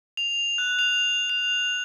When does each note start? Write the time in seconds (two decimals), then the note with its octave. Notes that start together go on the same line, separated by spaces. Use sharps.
0.17 F7
0.58 F#6
0.79 F7
1.30 F7